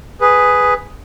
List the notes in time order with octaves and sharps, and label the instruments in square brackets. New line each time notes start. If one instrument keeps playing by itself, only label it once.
[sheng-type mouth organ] G#4 B4